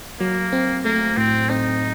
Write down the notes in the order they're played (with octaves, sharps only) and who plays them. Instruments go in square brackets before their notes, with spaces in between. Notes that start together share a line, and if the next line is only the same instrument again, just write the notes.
[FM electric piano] F#3 [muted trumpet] A#3
[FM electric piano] C4
[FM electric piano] A3 [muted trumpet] A#3
[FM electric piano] A2 [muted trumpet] C4
[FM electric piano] C4 [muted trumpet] D#4